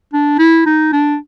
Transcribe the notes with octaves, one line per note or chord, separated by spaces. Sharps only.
D4
E4
D#4
D4